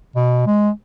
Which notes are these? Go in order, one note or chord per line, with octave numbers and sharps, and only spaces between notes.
B2
G#3